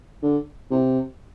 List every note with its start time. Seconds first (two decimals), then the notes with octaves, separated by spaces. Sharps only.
0.22 D3
0.71 C3